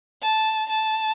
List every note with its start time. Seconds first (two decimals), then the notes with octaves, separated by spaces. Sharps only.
0.22 A5
0.69 A5